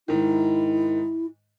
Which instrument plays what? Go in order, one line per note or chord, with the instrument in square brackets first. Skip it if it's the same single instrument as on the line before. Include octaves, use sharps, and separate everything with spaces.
[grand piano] G#2 D#3 [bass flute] E4